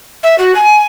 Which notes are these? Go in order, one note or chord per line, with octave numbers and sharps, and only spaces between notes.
E5
F#4
G#5